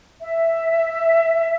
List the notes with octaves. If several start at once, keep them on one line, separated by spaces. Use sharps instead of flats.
E5